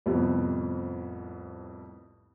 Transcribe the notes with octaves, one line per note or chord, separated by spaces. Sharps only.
C2 F2 A2 C3 B3 C4